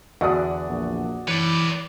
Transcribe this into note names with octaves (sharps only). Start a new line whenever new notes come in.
E2 D3 F#4 D5 D#6
A#1
E3 B4 C#5 D5